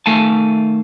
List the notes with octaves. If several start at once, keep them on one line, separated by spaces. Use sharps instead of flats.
D#3 A3 F5 G#5 A5